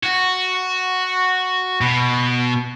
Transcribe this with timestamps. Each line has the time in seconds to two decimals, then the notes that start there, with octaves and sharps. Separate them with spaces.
0.04 F#4
1.81 B2